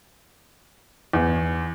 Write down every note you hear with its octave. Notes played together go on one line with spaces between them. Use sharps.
E2